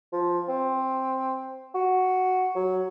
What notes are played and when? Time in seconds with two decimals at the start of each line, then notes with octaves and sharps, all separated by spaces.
0.13 F3
0.49 C4
1.74 F#4
2.55 F#3